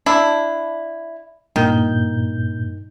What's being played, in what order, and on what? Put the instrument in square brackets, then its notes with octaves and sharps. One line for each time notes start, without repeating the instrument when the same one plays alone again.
[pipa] D4 E4
[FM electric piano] G2 A#2 G6 [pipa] D#3